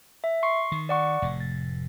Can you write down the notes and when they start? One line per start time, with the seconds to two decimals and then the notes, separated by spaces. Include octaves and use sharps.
0.24 E5
0.43 C6 C#6 C7
0.72 D#3
0.89 D5 F#5 C#6
1.22 F1 A2
1.40 A6